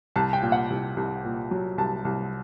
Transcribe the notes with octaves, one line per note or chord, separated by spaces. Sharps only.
C2 A5
G5
A#2
F#5
C2
C2
A#2
F#3
C2 A5
C2